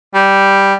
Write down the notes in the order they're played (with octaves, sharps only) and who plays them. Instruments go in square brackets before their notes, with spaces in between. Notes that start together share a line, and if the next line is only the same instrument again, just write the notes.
[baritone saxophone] G3